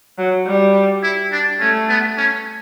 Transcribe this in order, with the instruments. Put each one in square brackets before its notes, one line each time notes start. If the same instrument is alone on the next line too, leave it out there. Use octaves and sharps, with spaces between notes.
[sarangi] F#3
G3
[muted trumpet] E4
D4
[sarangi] A3 [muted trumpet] C#4
[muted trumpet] B3
C#4